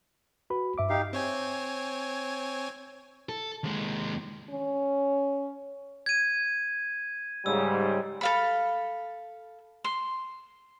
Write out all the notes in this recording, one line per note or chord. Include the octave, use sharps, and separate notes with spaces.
F#4 B4 B5
G2 E5 D6
D#4 G4 F5
C4 C#5 G#5
A4
D#2 G#3
C#4
G#6 D#7
G#2 C#3 G3 E6
A4 F5 B5
C6